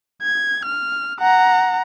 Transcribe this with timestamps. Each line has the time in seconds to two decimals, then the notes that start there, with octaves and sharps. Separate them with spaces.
0.22 G#6
0.65 F6
1.20 F#5 A#5